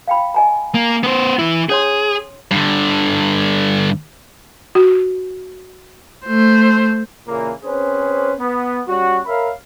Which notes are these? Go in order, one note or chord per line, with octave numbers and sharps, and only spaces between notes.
F5 G5 B5
D#5 G#5 A#5
A#3
B3 C5
E3 E4
C#4 G#4 C#5 C6
G2 D3
F#4
A3 C5
A#2 C#3 E3 A#3
C4 C#4 G#4 B4 C5
B3
G3 C#4 F#4
A#4 C#5 E5 F5 B5